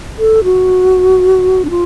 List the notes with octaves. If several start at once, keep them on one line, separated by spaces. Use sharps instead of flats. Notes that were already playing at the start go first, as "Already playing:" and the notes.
A4
F#4
D4
F4